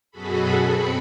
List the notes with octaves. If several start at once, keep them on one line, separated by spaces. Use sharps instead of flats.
F#2 B2 F#4 G#4 A4 B5
C4 B5 C#7